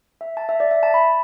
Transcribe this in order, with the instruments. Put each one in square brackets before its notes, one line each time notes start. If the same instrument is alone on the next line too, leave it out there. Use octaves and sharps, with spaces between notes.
[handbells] E5
A5
E5
D5
E5
A5
B5